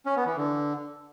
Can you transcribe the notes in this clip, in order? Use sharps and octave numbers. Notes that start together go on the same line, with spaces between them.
C#4
B3
E3
D3